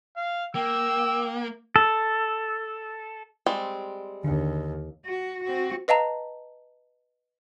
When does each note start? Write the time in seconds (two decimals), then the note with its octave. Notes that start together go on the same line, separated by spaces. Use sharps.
0.17 F5
0.55 A#3 G5 E6
1.76 A4
3.46 G3 G#3 C4
4.24 D#2 D3
5.05 F#4
5.44 C4 F#4
5.88 B4 D#5 F5 A5 A#5